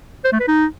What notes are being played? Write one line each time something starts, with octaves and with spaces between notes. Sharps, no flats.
C5
A3
B4
D#4